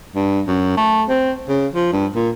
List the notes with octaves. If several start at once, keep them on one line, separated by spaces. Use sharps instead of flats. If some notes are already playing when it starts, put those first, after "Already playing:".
G2
F#2
A3
C4
C#3
F3
G2
A#2